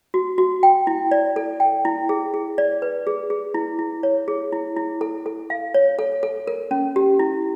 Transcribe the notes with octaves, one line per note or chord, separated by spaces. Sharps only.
F#4
F#4
G5
E4
D5
A4
G5
E4
G#4
G#4
D5
B4
G#4
G#4
E4
E4
C#5
G#4
E4
E4
A4
A4
F5
C#5
A4
A4
A#4
C#4
G4
E4